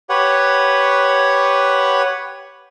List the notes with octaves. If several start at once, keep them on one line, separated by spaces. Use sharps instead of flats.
G4 B4 C#5 F#5